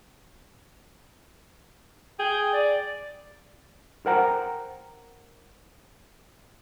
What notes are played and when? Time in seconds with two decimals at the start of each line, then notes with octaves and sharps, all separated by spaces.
2.19 G#4 G5
2.53 D5
4.06 A#4 C5 F#5 G5 A#5